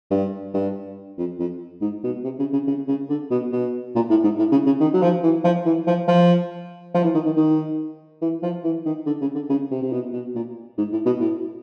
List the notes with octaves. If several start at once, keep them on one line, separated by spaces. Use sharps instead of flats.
G2
G2
F2
F2
G#2
B2
C3
C#3
C#3
C#3
C#3
D3
B2
B2
A#2
A2
G#2
A2
C#3
C#3
D#3
F#3
F3
E3
F3
E3
F3
F3
F3
E3
D#3
D#3
D#3
E3
F3
E3
D#3
D3
C#3
D3
C#3
C3
C3
B2
B2
A#2
G#2
A2
B2
A2